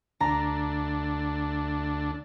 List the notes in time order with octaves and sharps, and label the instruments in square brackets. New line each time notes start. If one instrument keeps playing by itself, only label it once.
[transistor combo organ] D2 D4 [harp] A#5